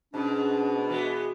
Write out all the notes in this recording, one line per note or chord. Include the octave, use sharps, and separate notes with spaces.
G#2 B2 C#4 D4
E3 G#3 B3 F#4